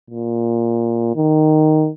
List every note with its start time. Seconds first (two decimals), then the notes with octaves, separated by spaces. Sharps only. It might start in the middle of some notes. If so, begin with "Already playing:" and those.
0.10 A#2
1.15 D#3